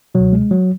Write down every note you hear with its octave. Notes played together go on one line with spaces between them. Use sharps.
C#2 B2 F#3
G#3
F#3